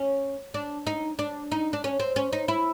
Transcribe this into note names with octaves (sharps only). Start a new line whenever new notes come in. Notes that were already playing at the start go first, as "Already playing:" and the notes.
Already playing: C#4
D4
D#4
D4
D#4
D4
C#4
C4
C#4
D#4
E4